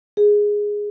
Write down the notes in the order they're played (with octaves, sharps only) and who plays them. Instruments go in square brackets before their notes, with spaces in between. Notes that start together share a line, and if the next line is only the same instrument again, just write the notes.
[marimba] G#4